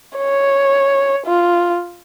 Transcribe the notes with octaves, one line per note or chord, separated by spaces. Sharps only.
C#5
F4